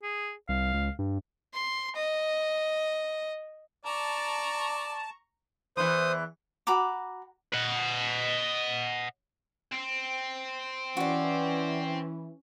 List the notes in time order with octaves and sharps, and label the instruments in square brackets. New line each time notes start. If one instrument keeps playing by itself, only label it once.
[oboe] G#4
[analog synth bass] C2 [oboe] F5
[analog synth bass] C#2
G2
[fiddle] C6
D#5
[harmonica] D5 [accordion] A5 [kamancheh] A#5 C#6
[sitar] E2 E3 [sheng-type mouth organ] C5 D#6
[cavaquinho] F#4 A#5 B5 D6
[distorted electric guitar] D#5 F#5
C4
[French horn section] E3 [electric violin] C#4 [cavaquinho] F#4 D5